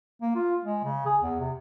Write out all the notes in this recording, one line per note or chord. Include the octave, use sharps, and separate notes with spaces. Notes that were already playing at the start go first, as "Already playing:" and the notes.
A#3
F4
G#3
C#3
G#4
E2
C3